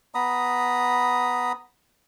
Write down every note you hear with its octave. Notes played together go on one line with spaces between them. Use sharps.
B3 A#5 B5 D#6